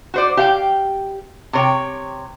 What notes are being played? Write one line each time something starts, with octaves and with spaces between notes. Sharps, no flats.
F#4 C5 D5
G4 F5 G5
C3 C#5 G5